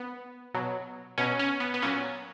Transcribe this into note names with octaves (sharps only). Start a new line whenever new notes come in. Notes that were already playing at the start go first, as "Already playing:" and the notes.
Already playing: B3
B2 F#3
B2 F#3 C#4
C#4
B3
B3
A#2 F#3 C#4